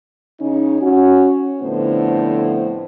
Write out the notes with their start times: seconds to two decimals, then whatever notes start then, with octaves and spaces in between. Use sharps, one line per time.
0.40 C#3 C#4 D#4
0.81 C#4 F#4
1.61 F2 A2 D3 B3 C5